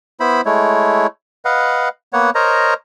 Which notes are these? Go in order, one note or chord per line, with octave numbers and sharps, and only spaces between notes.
B3 E4 C5 B5
G#3 A3 E4 C#5
B4 D#5 F5 F#5
A#3 B3 C#5 F#5
A#4 C5 C#5 D#5 A#5